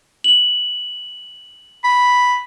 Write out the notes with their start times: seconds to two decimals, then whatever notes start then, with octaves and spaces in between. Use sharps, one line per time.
0.24 F#7
1.84 B5